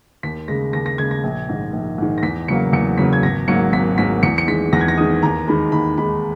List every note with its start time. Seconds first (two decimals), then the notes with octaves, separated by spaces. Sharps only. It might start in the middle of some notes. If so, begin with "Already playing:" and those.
0.23 D#2 B6
0.48 C#3 G#3 A#6
0.73 D#2 A#6
0.86 A#6
0.98 C#3 G#3 G#6
1.11 A#6
1.24 A#1
1.49 G#2 D#3
1.73 A#1
1.98 G#2 D#3
2.18 A#6
2.23 E2 B6
2.48 C#3 F#3 A#3 C#7
2.73 E2 C#7
2.98 C#3 F#3 A#3 B6
3.13 G#6
3.22 G#1 A#6
3.48 G#2 F#3 A#3 C#7
3.73 G#1 B6
3.98 G#2 F#3 A#3 B6
4.23 E2 C#7
4.38 C#7
4.47 D#3 G#3 B6
4.73 E2 A#6
4.81 G#6
4.88 A#6
4.98 D#3 G#3 D#6
5.22 D#2 A#5
5.48 D#3 G#3 B5
5.72 D#2 B5
5.98 D#3 G#3 B5